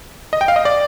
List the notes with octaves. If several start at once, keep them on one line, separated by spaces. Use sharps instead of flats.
D#5
G5
F5
D#5
D5